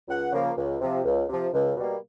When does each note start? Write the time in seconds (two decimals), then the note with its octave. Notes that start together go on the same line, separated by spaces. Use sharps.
0.08 C#2 F#5
0.32 C#3 F3 A#3
0.57 C#2
0.81 C3 F3
1.05 C#2
1.29 C3 F3
1.53 C#2
1.76 B2 G3 A#3